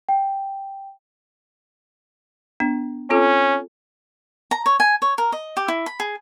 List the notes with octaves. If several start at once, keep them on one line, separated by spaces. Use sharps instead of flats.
G5
B3 D4
C4 C#4 F4 A4
A#5
C#5
G#5
C#5
A#4
D#5
G4
E4
B5
G#4